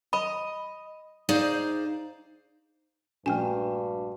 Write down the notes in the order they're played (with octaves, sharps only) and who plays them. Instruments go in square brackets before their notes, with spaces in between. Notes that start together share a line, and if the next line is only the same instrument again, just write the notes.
[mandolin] D#5 [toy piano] B5
[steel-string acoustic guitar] D#4 G#4 C5 D5 F5
[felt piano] A#1 [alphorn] G2 [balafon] A3 G5 G#5 [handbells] F#4